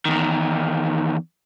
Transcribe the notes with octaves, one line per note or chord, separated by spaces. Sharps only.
E2 D#3